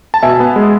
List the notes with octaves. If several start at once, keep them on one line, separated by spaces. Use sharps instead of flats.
A5
B2 E5 G#5
B3
G#3